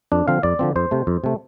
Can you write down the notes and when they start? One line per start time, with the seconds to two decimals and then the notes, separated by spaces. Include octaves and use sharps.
0.12 F2 D4
0.28 D3 F3 C4 F5
0.43 F2 D5
0.59 D3 F3 C4
0.76 F2 C5
0.91 C3 A3
1.07 F2
1.24 C3 A3